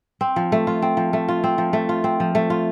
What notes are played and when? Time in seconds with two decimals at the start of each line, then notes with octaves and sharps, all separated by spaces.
0.21 C4
0.36 F3
0.52 A3
0.67 F4
0.82 C4
0.97 F3
1.13 A3
1.28 F4
1.44 C4
1.58 F3
1.73 A3
1.89 F4
2.04 C4
2.20 F3
2.35 A3
2.50 F4